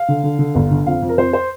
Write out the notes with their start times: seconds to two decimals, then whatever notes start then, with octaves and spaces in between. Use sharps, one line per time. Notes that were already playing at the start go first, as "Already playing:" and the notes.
Already playing: F5
0.08 D3
0.24 D3
0.39 D3
0.55 G1
0.71 D3
0.86 F2 F5
1.02 F2
1.09 A#4
1.18 F2 C5
1.33 C5